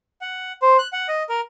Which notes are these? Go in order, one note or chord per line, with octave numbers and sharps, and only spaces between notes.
F#5
C5
F#6
F#5
D#5
A#4